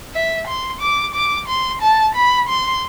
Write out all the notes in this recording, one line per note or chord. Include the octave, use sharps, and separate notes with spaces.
E5
C6
D6
D6
C6
A5
B5
C6